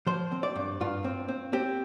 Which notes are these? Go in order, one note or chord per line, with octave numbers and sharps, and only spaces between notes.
F3 C5
C4
D5
G2
G2 F4
C4
C4
C4 G4